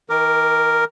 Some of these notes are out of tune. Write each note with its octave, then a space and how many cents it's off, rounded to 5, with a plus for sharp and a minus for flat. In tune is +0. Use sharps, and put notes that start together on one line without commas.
D#3 +45 A#4 +0 D6 +0